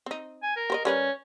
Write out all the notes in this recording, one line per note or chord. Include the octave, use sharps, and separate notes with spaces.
C4 D#4
G#5
A#4
G4 C5 D#5
G3 C#4 A#4 B4